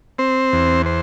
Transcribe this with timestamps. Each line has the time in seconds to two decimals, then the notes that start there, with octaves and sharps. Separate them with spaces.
0.18 C4 C5
0.53 E2
0.86 C5